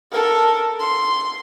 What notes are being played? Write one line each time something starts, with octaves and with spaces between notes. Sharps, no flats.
A4 A#4
C6